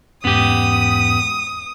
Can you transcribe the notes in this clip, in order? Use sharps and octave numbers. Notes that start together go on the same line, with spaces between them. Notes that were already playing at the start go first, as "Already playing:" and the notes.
E2 G#2 B3 C#4 G4 D#6